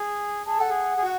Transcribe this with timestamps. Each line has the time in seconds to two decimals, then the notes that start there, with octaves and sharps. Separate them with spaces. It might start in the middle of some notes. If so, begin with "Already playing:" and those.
Already playing: G#4
0.46 G#4 A5
0.58 A4 F#5
0.70 G#4
0.97 G#4
1.03 F#4